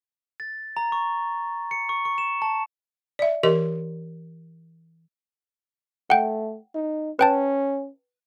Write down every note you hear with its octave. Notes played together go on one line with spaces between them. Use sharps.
A6
A#5
C#6
C#7
C#6
C#6
E7
A5
D5 E5
E3 G4 A#4 D#5 C6
A3 F#5 G5
D#4
C#4 B4 G5 A5